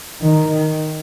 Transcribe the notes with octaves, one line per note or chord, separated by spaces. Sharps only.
D#3